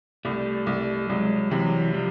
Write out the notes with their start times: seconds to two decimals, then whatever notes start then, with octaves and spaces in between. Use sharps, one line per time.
0.25 C2 G3 A3
0.67 C2
1.09 C2 F#3 G#3
1.51 C3 E3 F#3
1.94 F3 G3